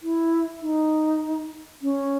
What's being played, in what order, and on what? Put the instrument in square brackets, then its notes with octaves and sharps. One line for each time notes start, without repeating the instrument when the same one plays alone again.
[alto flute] E4
D#4
C#4